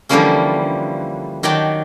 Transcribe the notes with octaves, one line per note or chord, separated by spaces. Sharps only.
D3 E3 F3 G3 A#3 C#4
D#3 F#3 D5 G5 A5